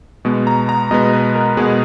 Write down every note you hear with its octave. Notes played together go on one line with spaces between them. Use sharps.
B2 G#3 B3
A#5
A#5
B2 G#3 B3 D#5
B4
A#4
B2 G#3 B3 G#4